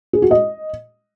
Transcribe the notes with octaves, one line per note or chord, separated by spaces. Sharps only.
G#4
F#4
D#5